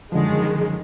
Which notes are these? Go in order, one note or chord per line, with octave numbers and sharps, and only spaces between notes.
F#2 D3 D#3 F3 G#3